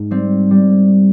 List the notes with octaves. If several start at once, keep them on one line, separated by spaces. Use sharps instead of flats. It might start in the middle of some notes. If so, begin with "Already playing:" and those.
Already playing: G#2
G3 C4
G3